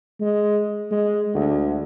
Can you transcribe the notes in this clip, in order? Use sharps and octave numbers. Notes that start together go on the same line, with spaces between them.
G#3
G#3
D2